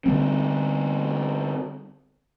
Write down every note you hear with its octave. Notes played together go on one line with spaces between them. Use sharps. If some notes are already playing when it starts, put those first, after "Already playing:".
D3 G3 C4